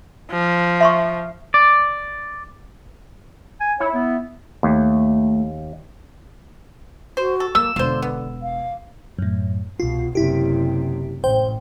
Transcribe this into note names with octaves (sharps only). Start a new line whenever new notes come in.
F3
E5 C6 C#6
D5
G#5
E4 C#5
B3
D#2 A3
F#4 C5
A4
F#3 A#3 E6
E1 D3 F4 C5
B3
F5
F#2 A2
C2 B2 F4
F#1 C3 E4 G4
A1 C5 G5